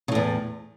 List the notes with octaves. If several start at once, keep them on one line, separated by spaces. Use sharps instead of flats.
E2 A2 C#3